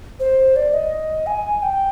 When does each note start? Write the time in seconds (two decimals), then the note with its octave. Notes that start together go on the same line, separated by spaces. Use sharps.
0.20 C5
0.56 D5
0.74 D#5
1.27 G#5
1.63 G5